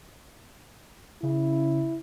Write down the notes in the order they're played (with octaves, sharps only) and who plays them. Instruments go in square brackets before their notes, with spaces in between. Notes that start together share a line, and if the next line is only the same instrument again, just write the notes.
[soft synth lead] C#3 [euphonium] E4